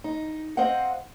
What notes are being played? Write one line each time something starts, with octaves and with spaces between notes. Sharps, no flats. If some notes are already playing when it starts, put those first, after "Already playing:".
D#4
C4 C5 D#5 F5 F#5